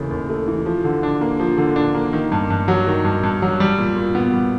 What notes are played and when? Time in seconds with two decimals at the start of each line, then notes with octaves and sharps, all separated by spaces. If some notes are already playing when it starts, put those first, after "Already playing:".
Already playing: D#2 C#3 E3 A3
0.11 D#2
0.30 A3
0.47 E3
0.66 F3
0.84 D3
1.03 D4
1.21 A#3
1.40 F3
1.58 D3
1.76 D4
1.95 A#3
2.13 D#3
2.32 G2
2.50 G2
2.68 F#3
2.87 D#3
3.04 G2
3.23 G2
3.42 F#3
3.60 G3
3.78 A#2
3.97 A#2
4.15 B3
4.34 G3